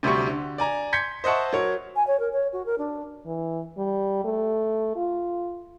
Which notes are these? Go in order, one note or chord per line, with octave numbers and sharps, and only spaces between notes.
D2 C3 F#3 G3 G4 C#6
D3
D5 G#5 A#5
C6 G6 G#6 B6 C#7
C5 D#5 E5 F#5 A5 C#6
F#3 A#4 C#5
G#5
C#5
A#4
C#5
F#4
A#4
D4
E3
G3
A3
F4